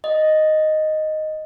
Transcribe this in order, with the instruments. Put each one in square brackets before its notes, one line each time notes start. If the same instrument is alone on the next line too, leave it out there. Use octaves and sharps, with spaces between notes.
[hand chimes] D#5